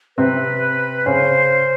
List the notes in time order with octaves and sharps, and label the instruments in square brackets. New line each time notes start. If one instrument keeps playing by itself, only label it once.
[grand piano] C3 C4 [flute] B4
[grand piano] C#3 C#4 [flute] C5